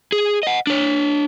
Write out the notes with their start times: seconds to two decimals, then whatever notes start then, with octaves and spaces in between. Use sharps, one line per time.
0.12 G#4
0.43 D#5 F#5
0.67 D4 C#5